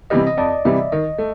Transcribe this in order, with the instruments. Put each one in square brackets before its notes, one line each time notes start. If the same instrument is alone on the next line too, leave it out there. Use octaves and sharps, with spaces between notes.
[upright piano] C3 E3 G3 [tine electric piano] D#5
[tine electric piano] D#5
[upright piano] F2 [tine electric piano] D5
[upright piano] C3 E3 G3 [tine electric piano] E5
[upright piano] D#3 [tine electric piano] D#5
[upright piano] A3